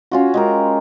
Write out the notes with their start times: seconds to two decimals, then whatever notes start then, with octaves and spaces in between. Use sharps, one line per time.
0.11 C#4 F4 F#4
0.34 G#3 G4 A#4